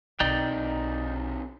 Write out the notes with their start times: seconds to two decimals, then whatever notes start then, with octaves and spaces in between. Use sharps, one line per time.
0.20 B1 C3 D#3 D#4 D5 G5